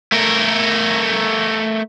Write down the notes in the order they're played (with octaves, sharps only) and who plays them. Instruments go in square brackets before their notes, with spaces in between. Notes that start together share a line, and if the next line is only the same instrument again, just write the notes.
[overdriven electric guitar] A3 A#4